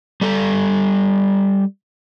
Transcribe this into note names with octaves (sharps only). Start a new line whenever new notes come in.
G3 A4